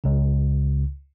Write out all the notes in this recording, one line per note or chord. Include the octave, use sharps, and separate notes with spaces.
C#2 C#3